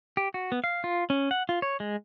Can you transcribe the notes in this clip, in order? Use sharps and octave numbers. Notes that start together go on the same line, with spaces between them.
G4
F#4
B3
F5
F4
C#4
F#5
F4
C#5
G#3